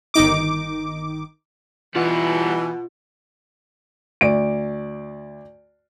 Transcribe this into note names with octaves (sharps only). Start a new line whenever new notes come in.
G1 D#3 D#4 D6
B2 E3 G3 F4 F#5
D2 D5 D7